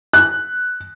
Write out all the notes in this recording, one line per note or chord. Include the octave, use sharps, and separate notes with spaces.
F#6